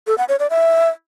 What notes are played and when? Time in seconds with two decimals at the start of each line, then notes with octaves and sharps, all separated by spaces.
0.07 A4
0.18 F#5
0.29 C#5
0.39 D5
0.50 E5